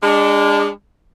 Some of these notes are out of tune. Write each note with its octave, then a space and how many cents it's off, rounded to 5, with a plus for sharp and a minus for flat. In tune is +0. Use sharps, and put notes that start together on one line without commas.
G#3 -30 D4 +0